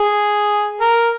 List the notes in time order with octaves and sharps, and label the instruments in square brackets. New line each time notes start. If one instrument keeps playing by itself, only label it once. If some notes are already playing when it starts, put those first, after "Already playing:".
Already playing: [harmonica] G#4
A#4